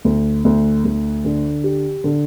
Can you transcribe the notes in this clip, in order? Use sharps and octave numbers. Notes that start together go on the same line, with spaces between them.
D2
D2
D2
D3
G4
D3